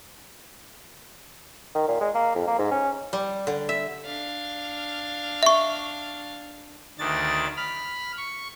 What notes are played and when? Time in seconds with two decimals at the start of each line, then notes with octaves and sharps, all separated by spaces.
1.75 D#3
1.88 A#2
2.01 G#3
2.15 A#3
2.35 F2
2.47 A#3
2.59 G#2
2.71 C#4
3.13 G3
3.47 D3
3.69 E5
4.05 D4 F5
5.43 E5 C#6
6.99 D2 D#3 D4 A6
7.57 B5 F6
8.17 C#6